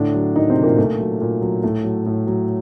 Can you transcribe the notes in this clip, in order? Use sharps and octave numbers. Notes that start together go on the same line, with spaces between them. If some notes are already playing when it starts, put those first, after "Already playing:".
Already playing: A2 D3 D4
F#3
A2 D#3 D#4
C3 C4
F#3
A#2 A#3
A#2 A3
F#3
A#2
F#3
A2 A3
F#3
A2
F#3